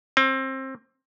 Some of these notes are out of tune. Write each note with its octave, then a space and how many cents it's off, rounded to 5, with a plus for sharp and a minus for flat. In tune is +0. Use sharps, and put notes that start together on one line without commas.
C4 +25